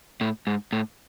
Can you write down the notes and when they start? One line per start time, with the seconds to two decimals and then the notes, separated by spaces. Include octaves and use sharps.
0.21 A2
0.47 G#2
0.72 A2